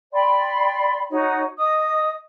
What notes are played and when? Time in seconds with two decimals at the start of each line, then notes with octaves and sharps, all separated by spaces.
0.13 D5 G5 B5 C6
1.11 D#4 F#4 C#5
1.57 D#5 D#6